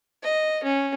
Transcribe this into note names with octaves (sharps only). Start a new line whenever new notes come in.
D#5
C#4